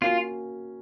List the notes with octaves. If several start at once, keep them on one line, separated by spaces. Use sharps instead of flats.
A#3 C#4 F4 F#4